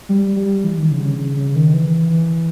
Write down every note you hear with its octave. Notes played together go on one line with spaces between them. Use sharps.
G3
G3
E3
D#3
C#3
C#3
C#3
C#3
D#3
E3